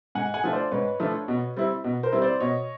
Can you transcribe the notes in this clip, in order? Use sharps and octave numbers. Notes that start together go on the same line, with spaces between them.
G#2 F#5 G#5
F#5 G#5
F3 A3 D4 F4
C5 D5
G#2 B4 C#5
F3 A3 D4 F4
B2
G3 C4 E4
B2
A#4 C5
G3 C4 E4
C5 D5
B2 C#5 D#5